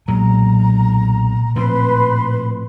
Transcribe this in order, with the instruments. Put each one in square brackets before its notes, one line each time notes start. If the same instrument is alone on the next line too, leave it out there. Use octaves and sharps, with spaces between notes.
[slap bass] B1 F#3 G#3 [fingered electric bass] A#2 [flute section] A#5
[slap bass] A2 F3 C4 [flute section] B4 B5 C6